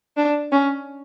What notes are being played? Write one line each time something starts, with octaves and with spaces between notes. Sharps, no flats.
D4
C#4